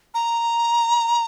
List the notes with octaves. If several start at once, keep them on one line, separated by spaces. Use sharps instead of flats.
A#5